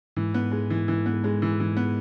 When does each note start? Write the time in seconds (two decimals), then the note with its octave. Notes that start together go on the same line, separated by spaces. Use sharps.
0.17 G#2 E3
0.34 B3
0.52 G#3
0.70 E3
0.88 E3
1.06 B3
1.24 G#3
1.42 E3
1.60 E3
1.77 B3